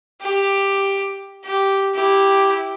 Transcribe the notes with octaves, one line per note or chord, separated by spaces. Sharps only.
G4
G4
E4 G4